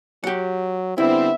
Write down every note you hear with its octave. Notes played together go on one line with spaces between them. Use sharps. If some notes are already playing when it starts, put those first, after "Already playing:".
F#3 G4 F#5
D3 G3 B3 C4 E4 E5